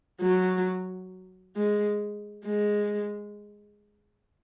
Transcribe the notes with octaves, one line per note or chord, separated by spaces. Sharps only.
F#3
G#3
G#3